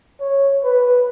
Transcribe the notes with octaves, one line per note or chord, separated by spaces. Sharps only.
C#5
B4